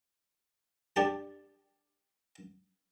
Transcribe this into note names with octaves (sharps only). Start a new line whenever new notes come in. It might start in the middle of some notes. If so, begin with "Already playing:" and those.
D4 G4 A5